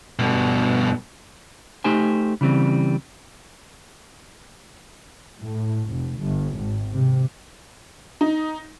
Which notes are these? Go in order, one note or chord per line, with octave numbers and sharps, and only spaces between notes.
G2 B2
A3 D#4 G4 C5 G#5
C#3 E3 G3 C4
A2
F1
G1
G#1
C3
D#4